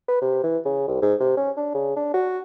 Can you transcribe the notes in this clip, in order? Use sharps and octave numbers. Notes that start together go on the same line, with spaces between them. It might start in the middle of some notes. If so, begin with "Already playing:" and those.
B4
C3
E3
C#3
C2
G#2
C3
C#4
D4
C#3
D4
F#4